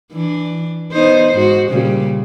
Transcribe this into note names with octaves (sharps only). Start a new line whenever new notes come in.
E3 D4
B3 D#4 C5
G#2 F#4
A#2 C#3 G3